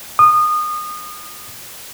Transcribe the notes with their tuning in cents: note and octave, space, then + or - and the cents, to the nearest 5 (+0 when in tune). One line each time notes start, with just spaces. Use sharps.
D#6 -25